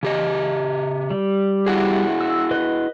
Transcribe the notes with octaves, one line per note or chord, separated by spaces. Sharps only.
C#3 G4 D#5
G3
E4 F#4 G#4
E6
B4 D#5